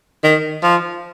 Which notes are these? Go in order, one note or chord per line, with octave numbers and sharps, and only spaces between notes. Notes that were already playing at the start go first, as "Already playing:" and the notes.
D#3
F3